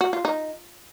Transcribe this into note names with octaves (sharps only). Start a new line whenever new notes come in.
F#4
F4
D#4